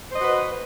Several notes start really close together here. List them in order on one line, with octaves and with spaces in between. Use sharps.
C5 D#5 F#4 B4